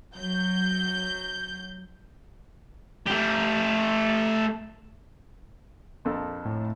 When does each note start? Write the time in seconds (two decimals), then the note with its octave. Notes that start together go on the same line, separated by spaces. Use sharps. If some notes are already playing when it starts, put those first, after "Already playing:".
0.16 F#3 G6
3.07 A3 G4
6.05 A#1 F2 A4
6.45 A2